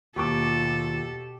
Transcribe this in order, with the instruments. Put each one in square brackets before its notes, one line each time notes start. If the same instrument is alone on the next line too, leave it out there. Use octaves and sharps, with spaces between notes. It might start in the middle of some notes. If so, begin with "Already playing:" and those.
[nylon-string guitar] D#2 [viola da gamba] B2 A4 [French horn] F4 [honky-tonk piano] G4 C#6 D6